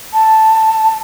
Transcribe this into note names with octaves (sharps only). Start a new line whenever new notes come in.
A5